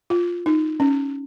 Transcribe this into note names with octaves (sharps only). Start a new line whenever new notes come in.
F4
D#4
C#4